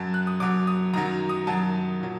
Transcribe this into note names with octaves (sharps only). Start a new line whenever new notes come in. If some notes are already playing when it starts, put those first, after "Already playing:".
Already playing: F#2 F#3 A5
F#6
D#6
F#2 F#3 D6
D#6
F#2 D#3 F#3 A#5
D#6
F#2 D#3 F#3 A5
A#2 F#3